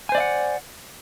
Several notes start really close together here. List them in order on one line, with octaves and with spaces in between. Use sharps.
G#5 C5 D5 E5 F#5